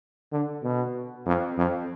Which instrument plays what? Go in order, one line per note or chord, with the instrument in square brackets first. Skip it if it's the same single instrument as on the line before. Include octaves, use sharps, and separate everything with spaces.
[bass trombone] D3
B2
F2
F2